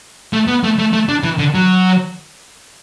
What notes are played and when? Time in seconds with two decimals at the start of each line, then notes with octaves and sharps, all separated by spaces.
0.33 A3
0.48 B3
0.64 A3
0.79 A3
0.93 A3
1.09 D4
1.23 E3
1.38 D3
1.55 F#3